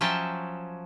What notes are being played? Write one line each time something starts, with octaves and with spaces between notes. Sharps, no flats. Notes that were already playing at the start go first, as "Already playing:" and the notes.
F3 F#3 C#4 E5 G5 A5